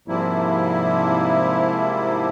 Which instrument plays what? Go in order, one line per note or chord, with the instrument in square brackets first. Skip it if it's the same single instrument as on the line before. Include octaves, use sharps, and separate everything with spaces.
[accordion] G#2 C3 F3 G3 A#3 E4